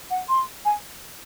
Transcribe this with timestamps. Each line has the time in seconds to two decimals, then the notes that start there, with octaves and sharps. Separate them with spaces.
0.10 F#5
0.29 C6
0.65 G#5